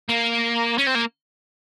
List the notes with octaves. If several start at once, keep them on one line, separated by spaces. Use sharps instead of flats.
A#3
C#4
C4
A#3